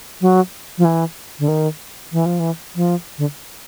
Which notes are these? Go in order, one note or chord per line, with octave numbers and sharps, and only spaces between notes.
F#3
F3
E3
D3
D#3
E3
F3
E3
F3
D3